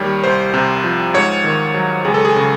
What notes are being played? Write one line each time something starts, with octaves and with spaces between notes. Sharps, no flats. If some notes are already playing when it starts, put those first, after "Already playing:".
Already playing: D#2 D#3 G3 C#5
C2 C5
C3
F3
G#2 C#5
D#3
F#3
C#2 G#4
A4
G#4
C#3